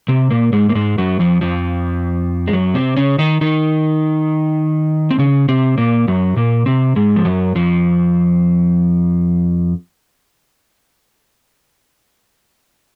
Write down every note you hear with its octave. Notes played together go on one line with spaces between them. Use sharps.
C3 C4
A#2 A#3
G#2 G#3
A#3
G#2 G#3
F#2 F#3
F2 F3
F2 F3
G#3
F#2 F#3
C3 C4
C#3 C#4
D#3 D#4
D#3 D#4
C4
C#3 C#4
C3 C4
A#2 A#3
F#2 F#3
A#2 A#3
C3 C4
G#2 G#3
F3
F#2 F#3
F2 F3